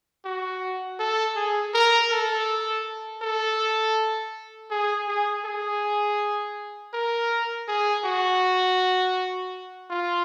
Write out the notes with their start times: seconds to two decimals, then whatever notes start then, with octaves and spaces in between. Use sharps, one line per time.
0.25 F#4
0.99 A4
1.36 G#4
1.74 A#4
2.11 A4
3.22 A4
4.71 G#4
5.08 G#4
5.45 G#4
6.93 A#4
7.68 G#4
8.05 F#4
9.90 F4